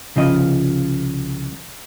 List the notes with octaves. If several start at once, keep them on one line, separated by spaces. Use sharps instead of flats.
C2 C#3 F3 D#5